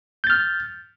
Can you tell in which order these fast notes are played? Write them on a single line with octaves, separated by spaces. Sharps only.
G6 A6 F6